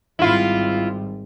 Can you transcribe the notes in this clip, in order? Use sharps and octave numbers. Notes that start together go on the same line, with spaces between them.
G#1 G3 E4 F4